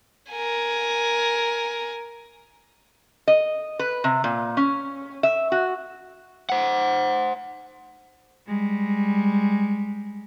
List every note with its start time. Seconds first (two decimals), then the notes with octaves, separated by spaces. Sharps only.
0.32 A#4 G#5
3.28 D#5
3.79 B4
4.04 C3
4.24 A#2
4.57 C#4
5.23 E5
5.52 F#4
6.50 C5 F#5
8.47 G3 G#3